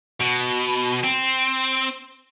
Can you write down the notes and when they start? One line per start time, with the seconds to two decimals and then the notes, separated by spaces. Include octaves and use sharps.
0.21 B2
1.04 C4